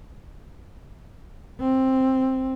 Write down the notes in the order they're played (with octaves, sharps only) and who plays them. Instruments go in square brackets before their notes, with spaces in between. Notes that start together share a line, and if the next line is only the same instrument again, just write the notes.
[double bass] C4